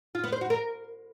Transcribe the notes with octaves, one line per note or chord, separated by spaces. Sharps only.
F4
B3
C5
F#4
A#4